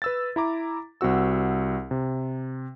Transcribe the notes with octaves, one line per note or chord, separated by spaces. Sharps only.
B4 E6 A6
E4 A#5 D6
C2 C4 F#4 E6
C3